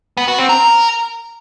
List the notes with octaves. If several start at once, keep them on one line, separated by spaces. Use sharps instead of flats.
B3
F#4
C4
A#4